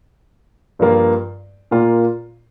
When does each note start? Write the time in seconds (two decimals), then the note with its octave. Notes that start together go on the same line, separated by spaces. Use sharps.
0.79 G2 F3 A#3 F4
1.71 A#2 A#3 F4